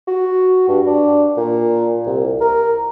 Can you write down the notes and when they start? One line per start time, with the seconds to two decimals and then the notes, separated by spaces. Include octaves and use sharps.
0.07 F#4
0.68 G2
0.87 D4
1.37 A#2
2.06 C2
2.41 A#4